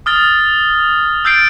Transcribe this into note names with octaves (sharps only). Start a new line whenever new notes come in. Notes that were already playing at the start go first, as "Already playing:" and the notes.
D#6 F6 A6
E6 F6 G6 A6 C7 D7